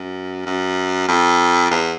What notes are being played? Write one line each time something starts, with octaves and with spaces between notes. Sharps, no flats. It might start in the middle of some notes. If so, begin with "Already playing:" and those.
Already playing: F#2
F#2
F2
E2